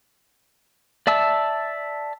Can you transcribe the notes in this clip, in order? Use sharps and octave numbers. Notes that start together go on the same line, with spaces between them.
D5 E5 A5 E6